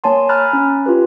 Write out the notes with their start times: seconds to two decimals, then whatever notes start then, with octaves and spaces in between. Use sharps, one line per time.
0.04 A#3 C#5 G#5 A5 C6
0.29 G#5 A#5 B5 F6 F#6 A6
0.53 C#4
0.86 F4 G4 B4